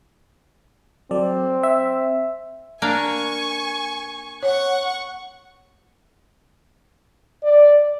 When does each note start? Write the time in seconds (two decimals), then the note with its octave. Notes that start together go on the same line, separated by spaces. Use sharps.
1.11 F#3 C4 A4 D5
1.63 E5
2.82 A#3 D4 F5 G#5 C#6
4.43 C#5 F#5 C#6
7.43 D5